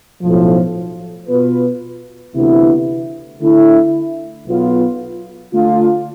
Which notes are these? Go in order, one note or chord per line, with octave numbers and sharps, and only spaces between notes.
B1 A2 F3
B2 B3 F4 B4
D2 C3 E3 B3 E4
D3 A3 E4
B1 B2 B3 F4
D3 A3 D4 F4